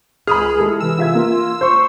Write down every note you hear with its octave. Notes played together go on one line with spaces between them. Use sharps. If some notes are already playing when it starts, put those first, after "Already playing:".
C#2 G#4 B5 D#6 F6
G#3 E4 A4
C3 E3 E6
F4 E5 G#6
A#3 F4
C5 C6 C#6